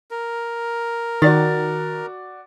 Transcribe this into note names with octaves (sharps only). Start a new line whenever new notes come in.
A#4
D#3 F#4 D5 A6